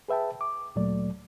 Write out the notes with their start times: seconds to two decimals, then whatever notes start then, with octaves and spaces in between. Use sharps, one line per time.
0.08 G#4 B4 E5 G5 A5
0.41 D6
0.76 D2 A#2 F#3 A3 D5